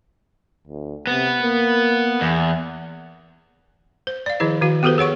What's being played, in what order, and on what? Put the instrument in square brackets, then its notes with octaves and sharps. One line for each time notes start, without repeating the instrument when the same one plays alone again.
[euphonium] D2
[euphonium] C3 [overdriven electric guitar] B3
[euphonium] A#3
[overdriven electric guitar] E2
[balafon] C5
D5 F5
D#3 F3 E4 G#4 D#5
D#3 F#4 F5
B3 F#4 G4 A4 B4 C5
G#4 C#5 F#5 C#6